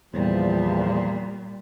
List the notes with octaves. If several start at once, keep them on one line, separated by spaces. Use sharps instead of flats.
E2 A#2 F3 G3